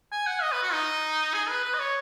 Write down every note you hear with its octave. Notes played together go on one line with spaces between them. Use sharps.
G#5
F#5
D#5
B4
F#4
D#4
G#4
B4
B4
D#5
C#5